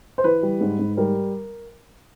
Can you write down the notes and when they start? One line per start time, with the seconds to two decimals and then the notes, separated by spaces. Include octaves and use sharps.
0.18 C5
0.24 E3 B4
0.43 G3
0.61 G#2
0.79 G#2
0.97 G3 A#4